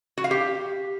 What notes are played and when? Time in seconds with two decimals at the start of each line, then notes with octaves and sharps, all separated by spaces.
0.18 F#4
0.24 F5
0.31 G4